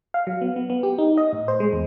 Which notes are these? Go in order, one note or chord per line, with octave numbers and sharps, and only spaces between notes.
F5
F#3
B3
B3
B3
G4
D#4
D#5
A2
C5
G#3
E2